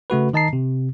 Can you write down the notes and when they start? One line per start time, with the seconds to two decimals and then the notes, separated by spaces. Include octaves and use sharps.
0.10 C#3 A3 F#4 B4
0.33 D#3 D#5 A5 A#5 C7
0.53 C3